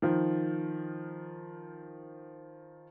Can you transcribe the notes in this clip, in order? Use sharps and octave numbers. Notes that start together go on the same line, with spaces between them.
D#3 F3